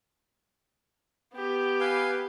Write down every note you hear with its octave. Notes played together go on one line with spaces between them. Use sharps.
B3 G4
B4 F5 G#5